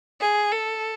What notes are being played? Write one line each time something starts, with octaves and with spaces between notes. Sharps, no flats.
G#4
A4